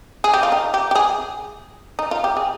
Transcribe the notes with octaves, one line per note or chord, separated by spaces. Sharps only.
G#4
G4
F4
D#4
G4
G4
G#4
D#4
F4
G4
G#4